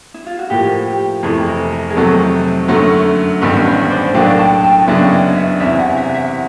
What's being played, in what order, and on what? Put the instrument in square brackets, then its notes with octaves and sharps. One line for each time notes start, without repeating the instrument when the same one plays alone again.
[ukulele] E4
F4
F#4
[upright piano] A2 F3 A#3 [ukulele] G4
[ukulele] G4
[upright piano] F2 C3 E3 A3 [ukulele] G#4
[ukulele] A#4
A#4
G#4
[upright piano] F2 C3 D#3 F#3 A3 [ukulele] A4
[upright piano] F#2 D3 F#3 A3
[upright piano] A1 G2 D#3 G3 B3 [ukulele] B4
[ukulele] B4 C#5
C5 D5
[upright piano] B1 A2 F#3 A#3 D4 [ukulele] F5 G5
[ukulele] G5 A5
G5 A5
[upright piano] F#2 C#3 F#3 B3 D4 [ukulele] D5 E5
[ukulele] C#5 D#5
D5 E5
[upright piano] E2 C3 E3 [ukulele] D5 E5
[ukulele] E5 F#5
E5 F#5
E5 F#5